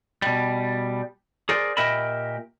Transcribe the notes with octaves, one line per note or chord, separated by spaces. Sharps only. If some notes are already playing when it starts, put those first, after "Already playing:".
B2 G3
G#4 A#4 C5 D5
A#2 G4 A#4 D#5 E5 B5